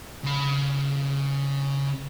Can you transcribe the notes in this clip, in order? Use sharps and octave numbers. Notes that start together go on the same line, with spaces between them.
C#3 B5